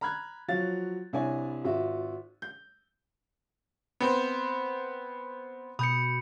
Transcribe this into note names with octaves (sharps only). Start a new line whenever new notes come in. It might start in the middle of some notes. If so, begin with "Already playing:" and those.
A#5 B5 F6 F#6 G#6
F3 F#3 F5 A6
C2 D4 E4 C#5 G#5
G#1 F4 F#4 E5
G6
B3 C4 C5
B2 B5 D#6 G6 C#7